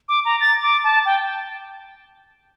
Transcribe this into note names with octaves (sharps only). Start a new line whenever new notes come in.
D6
A#5
A6
D6
A5
G5